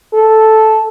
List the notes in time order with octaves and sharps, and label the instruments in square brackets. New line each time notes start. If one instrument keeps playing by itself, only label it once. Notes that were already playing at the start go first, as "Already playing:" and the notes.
[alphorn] A4